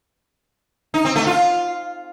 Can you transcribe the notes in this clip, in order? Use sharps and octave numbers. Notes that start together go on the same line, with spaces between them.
D#4
C4
A3
F4